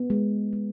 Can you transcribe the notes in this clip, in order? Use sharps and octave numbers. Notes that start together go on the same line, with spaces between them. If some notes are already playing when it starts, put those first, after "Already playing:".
Already playing: B3
G#3
G#3